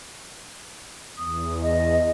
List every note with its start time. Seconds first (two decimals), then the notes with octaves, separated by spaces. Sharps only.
1.18 E2 D#6
1.62 D#5